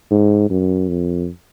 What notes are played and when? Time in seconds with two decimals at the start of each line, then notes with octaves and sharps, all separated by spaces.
0.11 G#2
0.50 F#2
0.89 F2